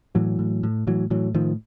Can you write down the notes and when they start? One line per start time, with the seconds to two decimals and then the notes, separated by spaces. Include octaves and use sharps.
0.15 A2 E3 F#3
0.39 A2
0.63 A2
0.87 A2 E3 F#3
1.10 A2 E3 F#3
1.35 A2 D#3 F3